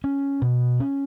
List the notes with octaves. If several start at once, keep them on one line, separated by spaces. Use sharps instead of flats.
C#4
B2
C#4